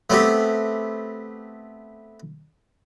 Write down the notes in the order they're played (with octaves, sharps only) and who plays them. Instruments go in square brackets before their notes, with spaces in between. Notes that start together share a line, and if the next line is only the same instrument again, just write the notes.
[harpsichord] A3 B3 C4 G4